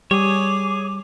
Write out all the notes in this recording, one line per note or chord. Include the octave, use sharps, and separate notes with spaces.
G3 G#4 C#5 D6